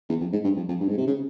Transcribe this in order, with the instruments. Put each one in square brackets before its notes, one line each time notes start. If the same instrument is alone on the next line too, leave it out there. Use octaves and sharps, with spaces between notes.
[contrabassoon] E2
F2
G#2
G2
F2
F2
G2
G#2
C3
C#3